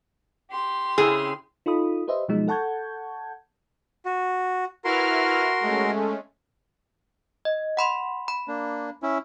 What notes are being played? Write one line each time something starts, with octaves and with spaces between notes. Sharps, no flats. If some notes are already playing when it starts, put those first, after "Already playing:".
G4 C6
C#3 C4 E4 G#4
D#4 F4 A4 B5 D#6
G4 B4 C5 D#5 E5
B2 F3 F#3 G#3 D#4
A4 F#5 A5 C#6 G6 G#6
F#4
E4 F#4 A#4 B4 C6 F6
G#3 A3 C#4
D#5
F#5 B5 C6
B5
A#3 D4
C#4 E4